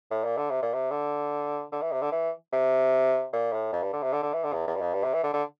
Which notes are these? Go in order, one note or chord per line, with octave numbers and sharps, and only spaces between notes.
A2
A#2
D3
C3
A#2
C3
D3
D3
E3
C3
D3
E3
C3
A#2
A2
F2
G2
D3
C3
D3
D3
E3
D3
E2
E2
G2
F2
G2
C3
E3
D3
D3